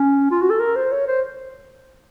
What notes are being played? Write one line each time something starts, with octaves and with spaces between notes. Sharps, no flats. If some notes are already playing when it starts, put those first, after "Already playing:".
Already playing: C#4
F4
F#4
A4
A#4
C5
C#5
C5